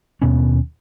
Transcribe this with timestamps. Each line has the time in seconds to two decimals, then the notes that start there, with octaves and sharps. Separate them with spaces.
0.22 D#2 B2 B3 C#4